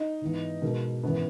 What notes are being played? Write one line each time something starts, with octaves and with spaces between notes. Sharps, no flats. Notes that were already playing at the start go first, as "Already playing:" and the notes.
Already playing: D#4
G#2 E3 B3
B2 G#3 D#4 F#4 A#4
G#1 F#2 E3 B3